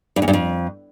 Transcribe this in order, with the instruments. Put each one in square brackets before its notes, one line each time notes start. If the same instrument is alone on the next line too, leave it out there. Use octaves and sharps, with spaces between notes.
[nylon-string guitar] G2
E2
G2
F2